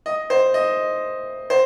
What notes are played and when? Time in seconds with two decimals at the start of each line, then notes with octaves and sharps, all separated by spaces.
0.06 D#5
0.30 C5
0.54 D#5
1.50 C5